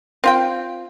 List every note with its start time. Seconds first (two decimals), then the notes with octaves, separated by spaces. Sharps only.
0.24 C4 F4 G5